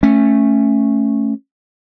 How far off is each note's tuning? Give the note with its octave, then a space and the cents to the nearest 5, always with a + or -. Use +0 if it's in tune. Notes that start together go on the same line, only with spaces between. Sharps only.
A3 +0 C#4 -10